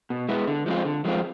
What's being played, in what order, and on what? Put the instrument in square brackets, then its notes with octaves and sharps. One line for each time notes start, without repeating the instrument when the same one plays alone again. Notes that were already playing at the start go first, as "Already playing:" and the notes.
[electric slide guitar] B2
G#3 B3 E4
D3
F3 G#3 C4 F4
D3
F3 G#3 C4 F4